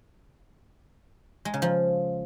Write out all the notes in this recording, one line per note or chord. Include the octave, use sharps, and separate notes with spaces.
G#3
C#3
F3